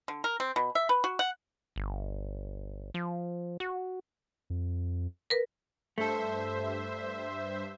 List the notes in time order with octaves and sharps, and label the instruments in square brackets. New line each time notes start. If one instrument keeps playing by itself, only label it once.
[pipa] D3
A#4
C4
B2
E5
B4
F#4
F#5
[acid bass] G1
F3
F#4
[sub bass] F2
[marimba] A#4 B4
[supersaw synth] G2 C5 E5 [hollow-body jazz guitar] A3 A4